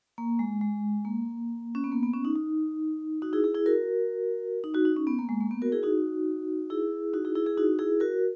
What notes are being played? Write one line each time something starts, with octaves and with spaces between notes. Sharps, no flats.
A#3
G#3
G#3
A#3
C#4
B3
A#3
B3
C#4
D#4
D#4
D#4 F#4
E4 G#4
E4 G#4
E4 G#4
F#4 A#4
D#4
D#4 F#4
D#4
C#4
B3
A#3
G#3
A#3
B3
F#4 A#4
E4 G#4
D#4 F#4
E4 G#4
D#4 F#4
E4 G#4
E4 G#4
E4 G#4
D#4 F#4
E4 G#4
F#4 A#4